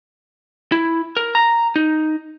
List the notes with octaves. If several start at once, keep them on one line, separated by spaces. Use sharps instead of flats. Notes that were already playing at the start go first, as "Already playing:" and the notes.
E4
A#4
A#5
D#4